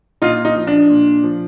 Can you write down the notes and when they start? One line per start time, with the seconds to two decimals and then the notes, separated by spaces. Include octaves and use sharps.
0.22 A#2 D#4 F4
0.45 D#4
0.55 F3
0.67 D4
0.90 A#2
1.24 F3